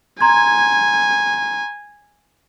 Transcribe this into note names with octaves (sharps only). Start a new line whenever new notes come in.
G#5 A#5 C6 G#6